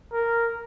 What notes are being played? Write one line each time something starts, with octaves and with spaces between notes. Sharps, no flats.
A#4